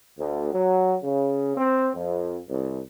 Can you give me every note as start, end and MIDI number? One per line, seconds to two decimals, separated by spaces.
0.18 0.49 38
0.52 0.95 54
1.03 1.51 49
1.57 1.88 60
1.94 2.37 41
2.49 2.80 36